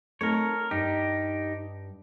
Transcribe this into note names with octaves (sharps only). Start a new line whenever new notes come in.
A3 C4 D#4 A#4 C#5
G2 D#4 G4